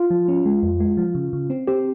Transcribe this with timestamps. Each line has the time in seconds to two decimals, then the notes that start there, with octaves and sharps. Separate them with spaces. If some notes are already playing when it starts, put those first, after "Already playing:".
Already playing: F4
0.10 F3
0.28 C#4
0.45 G#3
0.63 F2
0.80 G#3
0.97 F3
1.15 C#3
1.33 C#3
1.50 C4
1.68 C4 G4